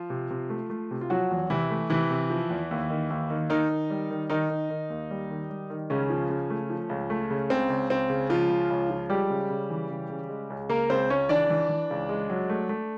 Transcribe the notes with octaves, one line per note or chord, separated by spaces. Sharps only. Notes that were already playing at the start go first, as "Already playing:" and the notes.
Already playing: F3 F4
C3
C3
A3
A3
C3
F4
F3 F#3 F#4
E2
C3 E3 E4
A3
C3 E3 E4
C3
F3
E2
D#2
D#3
D#2
D#3
D#3 D#4
D#3
G3
D#3
D#3 D#4
D#3
D#3
D#2
G3
D#3
G3
D#3
C#2 C#3 C#4
F3
C#3
A3
F3
C#2
A3
C#3
C#2 C4
C#2
C#2 C4
C#3
C#2 F3 F4
C#3
C#2
F3
G3 G#3 G4
C#3
C#3
E3
C#3
C#3
G#3
C#2
C#3 A#3 A#4
C#2 C4 C5
C#2 C#4 C#5
E3 D4 D5
E3
E3
C#2
G#3
F#3
A3
A3